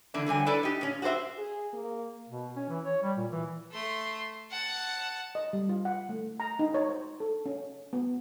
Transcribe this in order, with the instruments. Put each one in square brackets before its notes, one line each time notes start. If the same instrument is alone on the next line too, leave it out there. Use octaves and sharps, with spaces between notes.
[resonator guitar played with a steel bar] D3 E3 A#3 D4
D3 F#3 G3 G#5
D4 E4 A4 B4 D5
D#4 G4
A#2 C#4
F#4 G4 A4 C5 E5
[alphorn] G#4
A#3
[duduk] B2
C#4
E3
C#5
G3
A#2
E3
[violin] A3 C6
F#5 A5
[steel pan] D#5
G3
F4
F#5
A3
A#5
D#4
C#5
C5
A4
C#4
B3